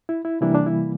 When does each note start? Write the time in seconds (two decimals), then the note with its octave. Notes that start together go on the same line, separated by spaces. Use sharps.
0.09 E4
0.25 E4
0.41 C3 E3 G3 A#3 D4 E4
0.54 D4
0.66 E4